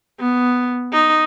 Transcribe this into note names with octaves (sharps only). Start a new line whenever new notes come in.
B3
D#4